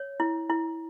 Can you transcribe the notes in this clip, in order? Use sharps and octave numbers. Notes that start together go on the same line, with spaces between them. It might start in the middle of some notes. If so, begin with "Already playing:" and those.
Already playing: C#5
E4
E4